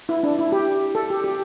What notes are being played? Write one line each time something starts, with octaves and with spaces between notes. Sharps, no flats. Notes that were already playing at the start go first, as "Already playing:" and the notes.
E4
D4
E4
G4
A4
G4
G4